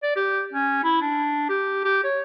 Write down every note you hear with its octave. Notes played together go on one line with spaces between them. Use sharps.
D5
G4
C#4
E4
D4
G4
G4
C#5